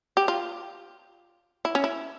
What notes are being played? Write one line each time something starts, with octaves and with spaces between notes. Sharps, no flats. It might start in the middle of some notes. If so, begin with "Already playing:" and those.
G4
F4
E4
C#4
E4